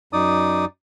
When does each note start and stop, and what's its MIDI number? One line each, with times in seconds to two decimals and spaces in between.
0.13 0.65 42
0.13 0.65 63
0.13 0.65 74
0.13 0.65 87